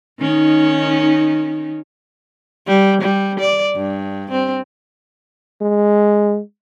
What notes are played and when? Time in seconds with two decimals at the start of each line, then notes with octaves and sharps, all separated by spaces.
0.20 D#3 C#4 D#4
2.67 G3
3.02 G3
3.40 D5
3.75 G2
4.31 C4
5.61 G#3